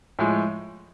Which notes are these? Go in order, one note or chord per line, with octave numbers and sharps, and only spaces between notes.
A2 F3 G#3